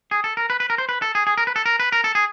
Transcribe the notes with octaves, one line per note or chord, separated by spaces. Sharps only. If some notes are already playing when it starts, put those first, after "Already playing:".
G#4
A4
A#4
B4
B4
A#4
C5
B4
A4
G#4
G#4
A#4
B4
A4
A#4
B4
A#4
A4
G#4